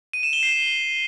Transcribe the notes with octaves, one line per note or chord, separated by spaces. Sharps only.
D#7
E7
G7
C7